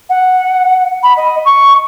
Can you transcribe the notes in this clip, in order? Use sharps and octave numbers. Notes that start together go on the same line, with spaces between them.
F#5
B5
D#5
C#6